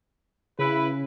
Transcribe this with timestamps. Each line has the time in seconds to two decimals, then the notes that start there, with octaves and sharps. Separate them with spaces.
0.59 C#3 E4 B4